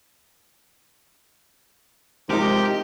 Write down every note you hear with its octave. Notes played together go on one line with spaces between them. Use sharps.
C3 F3 G#3 D#4 G4 A#4 D#5